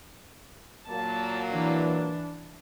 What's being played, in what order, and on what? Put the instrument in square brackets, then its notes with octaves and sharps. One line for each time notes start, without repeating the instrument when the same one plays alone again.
[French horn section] A#2 F#3 A#3 [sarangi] A5
[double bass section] E3 [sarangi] D4